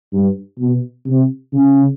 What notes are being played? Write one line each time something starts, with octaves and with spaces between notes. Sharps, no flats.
G2
B2
C3
C#3